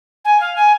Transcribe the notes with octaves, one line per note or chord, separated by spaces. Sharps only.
G#5
F5
G#5